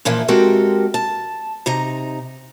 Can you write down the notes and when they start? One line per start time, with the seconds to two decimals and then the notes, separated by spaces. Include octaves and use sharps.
0.05 A#2 E3 F3 A#3 E4
0.28 G#3 C4 F#4 G4 A4 A#4
0.94 A5
1.66 C3 D#4 A#5